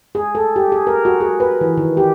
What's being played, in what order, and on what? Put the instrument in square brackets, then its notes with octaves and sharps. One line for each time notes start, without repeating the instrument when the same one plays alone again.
[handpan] G#4
A4
G4
G#4
A#4
F#4
G#4
B4
E3
D#3
G4